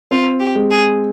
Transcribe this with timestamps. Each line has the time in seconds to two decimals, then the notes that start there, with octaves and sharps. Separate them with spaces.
0.11 C4 F4
0.40 G4
0.55 G#3
0.70 G#4